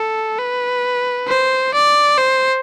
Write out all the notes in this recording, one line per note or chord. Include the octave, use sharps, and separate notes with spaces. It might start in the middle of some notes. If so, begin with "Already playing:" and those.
Already playing: A4
B4
C5
D5
C5